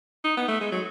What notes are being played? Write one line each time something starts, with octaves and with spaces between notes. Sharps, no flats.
D#4
B3
A3
G#3
F#3